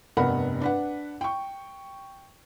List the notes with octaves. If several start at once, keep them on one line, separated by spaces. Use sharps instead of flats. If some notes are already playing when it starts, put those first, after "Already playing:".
F1 G2 B3 A#4 F#5 B5
D4 B4 F#5
G5 C#6